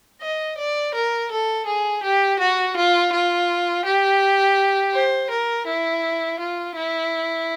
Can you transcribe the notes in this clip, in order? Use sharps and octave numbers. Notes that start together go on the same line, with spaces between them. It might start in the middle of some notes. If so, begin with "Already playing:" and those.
D#5
D5
A#4
A4
G#4
G4
F#4
F4
F4
G4
C5
A#4
E4
F4
E4